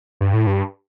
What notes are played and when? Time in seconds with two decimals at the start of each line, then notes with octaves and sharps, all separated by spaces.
0.21 G2
0.33 A2
0.47 G2